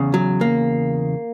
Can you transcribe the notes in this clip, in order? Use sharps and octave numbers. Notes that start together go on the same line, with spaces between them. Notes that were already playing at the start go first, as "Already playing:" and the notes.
Already playing: E2 C#3
F#3
A#3